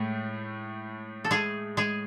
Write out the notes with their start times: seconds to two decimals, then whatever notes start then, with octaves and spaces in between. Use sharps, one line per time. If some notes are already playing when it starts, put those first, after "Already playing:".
Already playing: A2 G#3 A3
1.25 A4
1.31 G#3 G#4
1.77 G#3 G#4